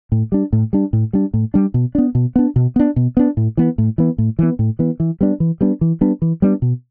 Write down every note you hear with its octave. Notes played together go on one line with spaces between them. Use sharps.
A2
G3 D4
A2
G3 D4
A2
G3 D4
A2
G3 D4
B2
B3 D4
B2
B3 D4
B2
B3 D4
B2
B3 D4
A2
E3 B3
A2
E3 B3
A2
E3 B3
A2
E3 B3
E3
G3 B3 D4
E3
G3 B3 D4
E3
G3 B3 D4
E3
G3 B3 D4
B2